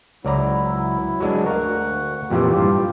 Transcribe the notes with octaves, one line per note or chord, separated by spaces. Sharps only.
C#2 F#3 E4 D5 A#5
F#3 G#3 D4
D2 A#4 F5 F#5 C#6
F2 A#2 E3 F4 G4
G2